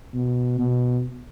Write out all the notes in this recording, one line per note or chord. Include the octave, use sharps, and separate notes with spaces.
B2
B2